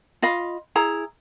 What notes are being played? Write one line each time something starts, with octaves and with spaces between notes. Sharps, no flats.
F4 D#5 F5 B5
E4 G#4 A#5